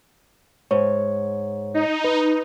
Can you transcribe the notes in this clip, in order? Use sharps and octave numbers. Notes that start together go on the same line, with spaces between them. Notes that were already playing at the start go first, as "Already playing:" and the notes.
G#2 C#5
D#4
B4